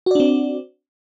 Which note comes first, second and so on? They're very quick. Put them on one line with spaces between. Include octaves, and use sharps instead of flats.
F#4 D5 D4 C4